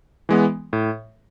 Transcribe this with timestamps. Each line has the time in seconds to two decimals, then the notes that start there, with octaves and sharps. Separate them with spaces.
0.29 E3 G#3 B3
0.73 A2